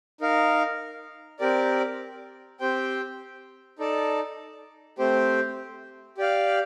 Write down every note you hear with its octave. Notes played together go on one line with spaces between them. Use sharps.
D#4 A#4 F5
C4 G4 A#4 D5
C4 G4 C5 G5
D#4 A4 D5 A5
A3 C4 G4 C5
G4 D5 F5